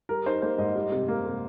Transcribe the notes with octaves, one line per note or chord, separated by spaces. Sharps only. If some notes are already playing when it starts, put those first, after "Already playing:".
G3 A#4
D#4 C5
A#3 C5
G#2 D#5
G3
C3
A#3
C3